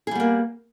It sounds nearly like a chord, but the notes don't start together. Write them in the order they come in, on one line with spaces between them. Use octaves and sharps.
G#4 G3 B3 A#3